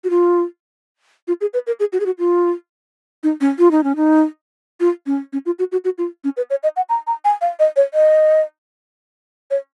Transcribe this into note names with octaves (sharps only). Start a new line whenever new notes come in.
F#4
F4
F4
G#4
B4
A#4
G#4
F#4
G#4
F#4
F4
D#4
C#4
F4
D#4
C#4
D#4
F4
C#4
C#4
F4
F#4
F#4
F#4
F4
C#4
B4
C#5
D#5
F#5
A#5
A#5
G#5
F5
D#5
C#5
D#5
C#5